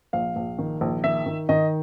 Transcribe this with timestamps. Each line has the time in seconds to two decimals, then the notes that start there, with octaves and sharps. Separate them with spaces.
0.13 A#1 F5
0.36 A#1
0.59 D#3
0.81 A#1
1.04 D#3 E5
1.26 D#3
1.49 D#3 D#5